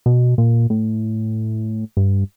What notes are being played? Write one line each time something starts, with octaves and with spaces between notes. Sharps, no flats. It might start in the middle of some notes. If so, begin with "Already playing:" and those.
B2
A#2
A2
G2